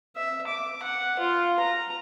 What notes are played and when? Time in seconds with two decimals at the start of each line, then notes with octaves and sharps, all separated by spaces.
0.17 E5
0.47 D6
0.83 F#5
1.20 F4
1.60 A#5